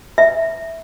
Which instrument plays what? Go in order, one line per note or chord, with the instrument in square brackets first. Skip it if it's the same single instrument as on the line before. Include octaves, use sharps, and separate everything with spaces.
[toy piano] E5